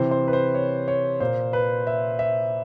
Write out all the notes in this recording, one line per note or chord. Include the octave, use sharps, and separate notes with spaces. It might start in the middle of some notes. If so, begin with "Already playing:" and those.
Already playing: C3 E3 C5
C5
B4
C5
C#5
C#5
A#2 C5
B4
E5
E5